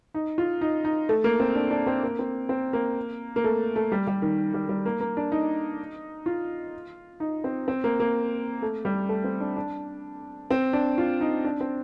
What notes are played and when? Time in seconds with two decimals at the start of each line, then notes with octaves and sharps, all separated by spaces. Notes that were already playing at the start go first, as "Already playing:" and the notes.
0.14 D#4
0.38 F4
0.61 D#4
0.85 D#4
1.09 A3
1.24 A#3
1.40 C4
1.55 D4
1.71 D4
1.87 C4
2.03 A#3
2.19 C4
2.49 C4
2.73 A#3
3.36 A#3
3.44 A3
3.76 A3
3.92 G3
4.07 G3
4.22 D#3
4.54 G3
4.69 G3
4.85 A#3
5.00 A#3
5.17 D4
5.32 D#4
6.26 F4
7.20 D#4
7.44 C4
7.68 C4
7.84 A#3
8.00 A#3
8.62 A3
8.85 G3
9.09 A3
9.24 C4
9.40 D4
9.56 D4
10.50 C4
10.73 D4
10.98 F4
11.21 D#4
11.44 D4
11.61 C4